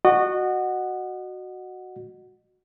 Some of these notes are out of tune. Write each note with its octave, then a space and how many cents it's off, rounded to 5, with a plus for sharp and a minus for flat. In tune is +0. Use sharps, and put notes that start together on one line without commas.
F#4 +0 D#5 -30 F#5 +0